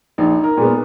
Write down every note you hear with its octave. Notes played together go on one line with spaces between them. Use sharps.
A#1 D#4
A#4
A#2 G#3 B3